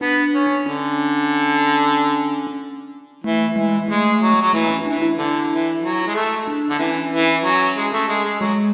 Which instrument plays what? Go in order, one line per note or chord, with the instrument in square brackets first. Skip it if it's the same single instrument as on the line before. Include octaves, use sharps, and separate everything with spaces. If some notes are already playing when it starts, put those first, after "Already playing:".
[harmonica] B3 [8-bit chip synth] D4
[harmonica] C#4
[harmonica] D3 [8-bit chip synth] C#4
[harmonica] E3 [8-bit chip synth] A3
[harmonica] E3 [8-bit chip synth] G#3
[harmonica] G#3 [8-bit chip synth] A3
[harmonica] F#3
F#3
[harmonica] E3 [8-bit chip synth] A3
[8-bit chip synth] C#4
[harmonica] E3 [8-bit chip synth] D4
[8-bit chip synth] E4
[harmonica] D3
E3
F#3
G#3
A3
[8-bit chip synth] D4
[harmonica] D3
[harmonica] E3 [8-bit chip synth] C#4
[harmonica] E3
F#3
G#3
A3
G#3
G#3
[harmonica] F#3 [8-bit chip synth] G#3